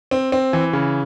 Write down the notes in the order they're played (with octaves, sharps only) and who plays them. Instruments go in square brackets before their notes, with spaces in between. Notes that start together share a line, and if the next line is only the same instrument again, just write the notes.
[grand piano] C4
C4
E3
C#3